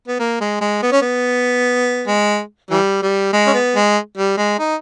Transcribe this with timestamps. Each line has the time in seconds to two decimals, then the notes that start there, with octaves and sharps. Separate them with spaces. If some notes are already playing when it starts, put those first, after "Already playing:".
0.08 B3
0.19 A#3
0.41 G#3
0.61 G#3
0.82 B3
0.92 C#4
1.02 B3
2.07 G#3
2.71 E3 G3
3.02 G3
3.33 G#3
3.47 C#4
3.54 B3
3.76 G#3
4.17 G3
4.38 G#3
4.59 D#4